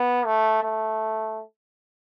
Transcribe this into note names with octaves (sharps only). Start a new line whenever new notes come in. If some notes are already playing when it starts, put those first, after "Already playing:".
Already playing: B3
A3
A3